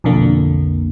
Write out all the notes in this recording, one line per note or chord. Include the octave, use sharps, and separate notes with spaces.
B1 F2 D3 A#3